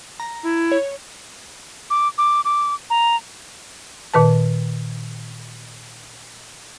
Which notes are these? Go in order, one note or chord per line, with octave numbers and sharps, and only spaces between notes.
A#5
E4
C#5
D6
D6
D6
A#5
A#2 D#3 B4 A5